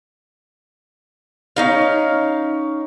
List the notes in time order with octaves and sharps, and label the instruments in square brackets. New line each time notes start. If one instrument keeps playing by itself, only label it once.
[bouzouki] C#4 D#4 F5